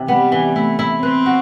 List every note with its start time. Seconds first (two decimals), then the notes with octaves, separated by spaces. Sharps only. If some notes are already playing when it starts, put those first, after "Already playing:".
Already playing: C3 E3
0.08 G3 B3
0.32 E3
0.56 A3 E4
0.79 E4
1.03 C4 B4
1.26 F#4